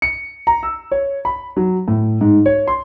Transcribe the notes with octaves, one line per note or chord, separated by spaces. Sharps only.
C#7
A#5
E6
C#5
B5
F#3
A2
G#2
C#5
C6